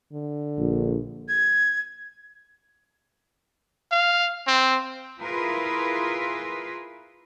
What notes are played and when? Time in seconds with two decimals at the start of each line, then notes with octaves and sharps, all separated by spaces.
0.13 D3
0.58 A#1
1.29 G#6
3.92 F5
4.47 C4
5.21 E4 F4 G#4 A#4 B4